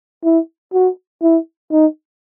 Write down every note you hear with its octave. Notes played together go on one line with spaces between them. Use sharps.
E4
F#4
E4
D#4